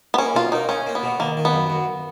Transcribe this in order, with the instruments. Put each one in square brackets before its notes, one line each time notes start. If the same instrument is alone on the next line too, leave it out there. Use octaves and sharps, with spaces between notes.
[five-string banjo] B3
[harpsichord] A#3 [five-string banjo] C#4
[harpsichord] B2 [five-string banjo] F4
[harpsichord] A#3 [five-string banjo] D#4
[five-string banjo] C#4 [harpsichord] D#4
[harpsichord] A#3
[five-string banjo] B3
[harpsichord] B2
[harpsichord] D#3 [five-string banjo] A#3
[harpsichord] D#3
[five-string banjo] B3
[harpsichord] F#2
F#2